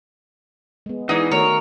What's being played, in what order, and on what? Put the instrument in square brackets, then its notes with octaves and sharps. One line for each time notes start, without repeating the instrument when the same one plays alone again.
[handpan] G#3 B3
[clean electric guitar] E3 [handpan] G#3 D5 F#5 [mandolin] D#4 G#4
[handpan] D#3 A3 F#4 [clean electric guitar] A#4 [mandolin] C#5